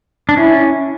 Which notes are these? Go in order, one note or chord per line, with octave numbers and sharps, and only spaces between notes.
D4
C#4 E4